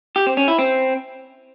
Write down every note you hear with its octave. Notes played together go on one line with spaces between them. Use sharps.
G4
C4
C#4
E4
C4